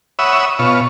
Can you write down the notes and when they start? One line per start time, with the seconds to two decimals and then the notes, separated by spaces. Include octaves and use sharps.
0.19 C#5 E5 F#5 B5 D#6 E6
0.59 B2 F4 C#5